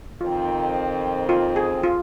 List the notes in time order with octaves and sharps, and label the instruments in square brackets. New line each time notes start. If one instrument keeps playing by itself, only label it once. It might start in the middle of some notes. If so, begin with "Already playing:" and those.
[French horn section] F2 D#3 C4 [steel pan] F4
[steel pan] F4
G#4
F4